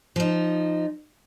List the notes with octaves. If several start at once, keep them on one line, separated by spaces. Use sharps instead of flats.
F3 D#4